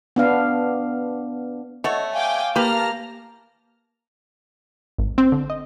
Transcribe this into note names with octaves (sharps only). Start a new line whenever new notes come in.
B3 D4 F5
A3 A4 C#5 D#5 F#5
F5 G5 G#5 D6
A#3 G4 B4 A5 F6 A#6
G#1
C4
D3
D#5